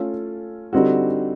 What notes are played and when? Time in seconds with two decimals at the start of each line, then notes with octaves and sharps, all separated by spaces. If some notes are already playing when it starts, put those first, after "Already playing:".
Already playing: A3 C#4 F4 A4
0.73 D3 G3 C4 D#4 F#4